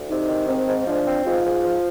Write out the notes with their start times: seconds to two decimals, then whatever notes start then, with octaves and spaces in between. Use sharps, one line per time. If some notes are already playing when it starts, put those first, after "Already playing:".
Already playing: D2
0.09 C3 D#4
0.29 D#3
0.48 G#2 C4
0.67 G#2
0.87 F3 D4
1.06 C4
1.25 G#2 F4
1.45 G#2
1.64 F3